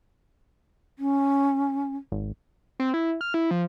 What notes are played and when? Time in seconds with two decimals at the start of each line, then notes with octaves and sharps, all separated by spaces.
0.99 C#4
2.12 G#1
2.80 C4
2.94 E4
3.21 F6
3.34 E4
3.51 F3